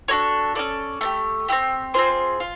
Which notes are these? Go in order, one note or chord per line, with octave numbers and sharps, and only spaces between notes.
D4 F#4 A4 C#5
C#4 E4 A4 D5
A3 D4 G4
C4 E4 G4
C4 F4 G#4 C5
F4